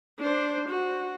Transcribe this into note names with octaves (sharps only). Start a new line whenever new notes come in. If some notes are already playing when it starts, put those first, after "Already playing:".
D4 C5
F#4